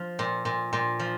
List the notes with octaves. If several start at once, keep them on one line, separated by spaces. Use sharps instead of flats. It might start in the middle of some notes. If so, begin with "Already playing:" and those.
Already playing: F3
A#2
A#2
A#2
F3